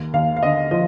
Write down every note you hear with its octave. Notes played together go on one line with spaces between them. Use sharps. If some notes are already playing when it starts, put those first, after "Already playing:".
Already playing: D#2
D#2 F5
F5
D3 D#5
F3 D#5